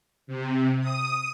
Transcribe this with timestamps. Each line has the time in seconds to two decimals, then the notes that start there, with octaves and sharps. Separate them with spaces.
0.27 C3
0.81 D#6